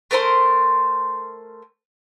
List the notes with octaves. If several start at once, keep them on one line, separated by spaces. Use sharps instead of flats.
A3 A#4 C5 C6